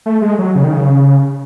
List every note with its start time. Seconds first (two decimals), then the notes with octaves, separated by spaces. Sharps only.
0.06 A3
0.22 G#3
0.38 F#3
0.55 C#3
0.64 D#3
0.73 C#3